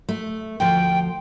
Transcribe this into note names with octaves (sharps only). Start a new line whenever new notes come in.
A3
D2 F3 G5